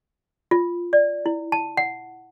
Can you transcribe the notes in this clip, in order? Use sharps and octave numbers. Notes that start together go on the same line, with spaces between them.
F4
D5
E4
A5
F#5